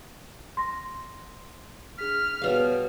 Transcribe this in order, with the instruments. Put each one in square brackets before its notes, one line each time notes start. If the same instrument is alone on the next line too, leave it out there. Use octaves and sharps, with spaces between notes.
[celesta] C6 A#6
[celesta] D4 G#4 B6 [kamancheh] F6
[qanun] B2 G3 F5 [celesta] G#4 B4 C#5